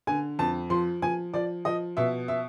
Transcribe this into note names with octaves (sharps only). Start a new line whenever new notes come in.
D3 G#5
F2 A5
F3 C6
F3 G#5
F3 D5
F3 D#5
B2 E5
E5